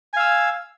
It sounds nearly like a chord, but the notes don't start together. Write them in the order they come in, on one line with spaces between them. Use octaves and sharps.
G#5 F5 E6